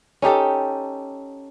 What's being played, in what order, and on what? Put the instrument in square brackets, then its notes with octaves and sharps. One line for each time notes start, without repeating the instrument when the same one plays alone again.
[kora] C#4 D#4 G4 A4